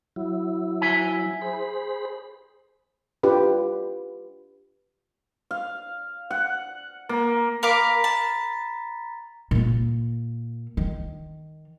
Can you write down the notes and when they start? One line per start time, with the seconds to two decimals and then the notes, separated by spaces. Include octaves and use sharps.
0.16 F#3 E4
0.81 E5 G#5
1.41 G#4 C5 B5
3.23 D4 F4 G4 B4
5.51 F5
6.31 F#5
7.09 A#3
7.63 A#4 F5 A#5 B5 D6 B6
8.04 A5
9.51 A#2 A#3
10.77 D#3